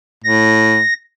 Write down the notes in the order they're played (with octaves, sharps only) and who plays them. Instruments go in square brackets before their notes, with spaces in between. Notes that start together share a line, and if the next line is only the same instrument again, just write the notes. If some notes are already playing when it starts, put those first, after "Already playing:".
[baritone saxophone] A2 [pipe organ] A#6